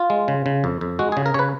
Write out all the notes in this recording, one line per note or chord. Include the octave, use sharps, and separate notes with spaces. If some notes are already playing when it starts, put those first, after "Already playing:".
Already playing: F4
G#3
C#3
C#3
F2
F2
G#3 F#4
G#4
C#3
A#4
C#3 B4 C#5